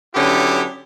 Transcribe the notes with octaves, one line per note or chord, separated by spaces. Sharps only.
D3 F#3 B3 C#4 E4 G4